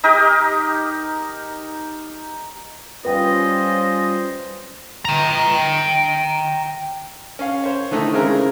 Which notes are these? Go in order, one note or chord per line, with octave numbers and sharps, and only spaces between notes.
D#4 G4 A#4 D#5
G3 C#4 F4 B4 C5 D#5 G5
G5 A#5
C#4 F5
C5 C#5
D3 D#3 A3 D#4 E4
C#3 G#3 C4 E4 A#4